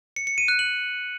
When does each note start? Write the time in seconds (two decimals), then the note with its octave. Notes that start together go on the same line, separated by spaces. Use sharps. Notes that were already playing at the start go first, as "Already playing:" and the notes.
0.16 C#7
0.27 C#7
0.38 D#7
0.48 F#6
0.59 F#7